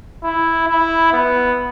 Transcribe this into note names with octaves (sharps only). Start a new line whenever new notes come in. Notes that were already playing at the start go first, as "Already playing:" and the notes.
E4
E4
B3